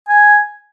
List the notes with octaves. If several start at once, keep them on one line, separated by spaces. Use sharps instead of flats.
G#5